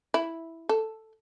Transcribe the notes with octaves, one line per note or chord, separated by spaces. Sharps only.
E4
A4